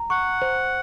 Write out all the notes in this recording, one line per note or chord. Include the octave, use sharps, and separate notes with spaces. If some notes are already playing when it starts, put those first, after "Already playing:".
Already playing: A#5
F#5 C#6
C5